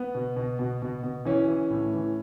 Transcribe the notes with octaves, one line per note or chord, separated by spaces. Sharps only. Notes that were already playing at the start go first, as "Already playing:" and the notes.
Already playing: B3
B2
B2
B2
B2
B2
E3 C#4
E3
A2
E3